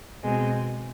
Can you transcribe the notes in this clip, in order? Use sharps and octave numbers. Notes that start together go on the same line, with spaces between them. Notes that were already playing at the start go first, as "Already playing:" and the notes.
B2 G#3 C4